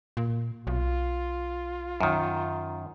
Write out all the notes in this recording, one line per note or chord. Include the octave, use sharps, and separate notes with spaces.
A#2
B1 F4
F#2 D#3